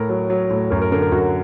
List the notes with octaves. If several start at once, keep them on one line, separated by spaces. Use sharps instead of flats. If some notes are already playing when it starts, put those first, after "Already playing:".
Already playing: A2 A#4
F#3
F#3
A2
F#2 A#4
A#4
D3 A#4
A#4
F#2 F#4